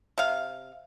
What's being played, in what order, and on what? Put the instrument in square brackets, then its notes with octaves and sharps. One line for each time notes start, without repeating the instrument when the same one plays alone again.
[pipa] C3 F5